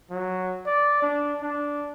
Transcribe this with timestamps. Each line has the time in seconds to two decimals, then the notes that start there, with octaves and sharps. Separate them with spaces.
0.10 F#3
0.66 D5
1.02 D4
1.41 D4